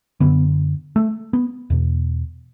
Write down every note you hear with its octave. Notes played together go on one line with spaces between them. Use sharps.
F#2 D3 B3
A3
B3
E2 B2